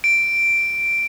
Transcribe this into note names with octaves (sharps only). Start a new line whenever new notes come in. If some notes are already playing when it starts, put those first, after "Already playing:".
D7